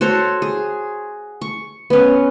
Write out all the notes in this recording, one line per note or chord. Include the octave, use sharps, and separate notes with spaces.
F#4 A4 C5 C#5
G#4
C#6
B3 C#4